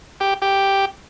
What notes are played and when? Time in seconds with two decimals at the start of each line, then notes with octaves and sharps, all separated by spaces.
0.20 G4
0.42 G4